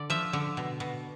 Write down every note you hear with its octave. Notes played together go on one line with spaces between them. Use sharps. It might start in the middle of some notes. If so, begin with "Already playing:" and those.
Already playing: D3 D5
F3 E5
D3
B2
B2